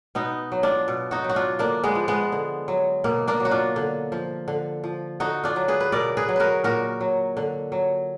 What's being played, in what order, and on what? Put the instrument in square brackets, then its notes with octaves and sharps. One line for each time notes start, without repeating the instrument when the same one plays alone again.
[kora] B2 B3 D#4
F#3
D4 F4
B2
D#4 F#4
F#3
F#4
D4 F4
D3 A#3 D4
G#3 B3
F3
G#3 B3
D3
F#3
B2 A#3
A#3 D4
F#3
F#4
D4 F4
D3
F3
D3
F3
D3 D#4 F#4
D4 F4
F#3
G#4 B4
B4
B2 A#4 D5
G#4 B4
F#3
F#4 A#4 B4
A#2 F#4 A#4
F#3
D3
F#3